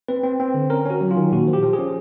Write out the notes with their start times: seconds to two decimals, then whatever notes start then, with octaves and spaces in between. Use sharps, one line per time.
0.08 C4 B4
0.23 C4
0.40 C4
0.54 D3
0.70 C#4 A#4
0.86 C#4 F#4
1.01 F#3
1.11 F4
1.17 D#3
1.32 A#2 F#4
1.47 F3
1.53 G4
1.63 F3
1.73 G#4
1.79 C#4